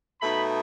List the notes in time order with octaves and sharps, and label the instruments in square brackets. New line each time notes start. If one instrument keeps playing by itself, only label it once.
[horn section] B2 A3 D#4 B5